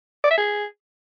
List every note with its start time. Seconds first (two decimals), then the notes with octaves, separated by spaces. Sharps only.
0.24 D5
0.31 E5
0.38 G#4